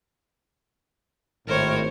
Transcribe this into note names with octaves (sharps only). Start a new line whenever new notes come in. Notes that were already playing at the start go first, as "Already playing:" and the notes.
G#1 A2 A#4 C5 C#5